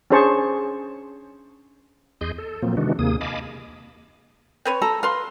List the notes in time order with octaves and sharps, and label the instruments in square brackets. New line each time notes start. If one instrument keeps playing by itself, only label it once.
[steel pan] C#4 D4 G#4 C5 A5 C#6
[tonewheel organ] E2 G#4 D#5 C6 G6
A4
A#2 F3 F#3 A#3 C4
C3 D#3 E3 G#3 D4 F#4
D#2 C3 A#3 G#4 D#6
D#5 F5 G#5 A5 B5 D6
[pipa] C4 B4 C#5
[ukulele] A4 [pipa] A#5
[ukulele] B4 [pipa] F5 C6